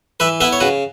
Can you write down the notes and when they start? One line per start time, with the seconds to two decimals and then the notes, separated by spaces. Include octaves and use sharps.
0.20 E3 B4 E5
0.41 B3 E4 B4 E5
0.53 C#5
0.60 C#3 F#4 B4